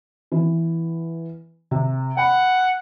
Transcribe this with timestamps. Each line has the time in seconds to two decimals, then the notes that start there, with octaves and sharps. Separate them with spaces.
0.32 E3 B3
1.71 C3
2.17 F#5 G5 B5